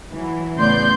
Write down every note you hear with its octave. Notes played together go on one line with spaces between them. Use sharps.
E3 F#3
A2 C#3 B3 D5 C6 G6